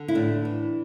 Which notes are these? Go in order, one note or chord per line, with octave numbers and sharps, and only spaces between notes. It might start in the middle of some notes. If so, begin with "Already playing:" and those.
Already playing: D3
E4
A2 D4
E3